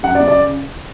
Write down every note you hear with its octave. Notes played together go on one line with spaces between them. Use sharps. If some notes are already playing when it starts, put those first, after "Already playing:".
F#2 F#5
D5
C#3
D5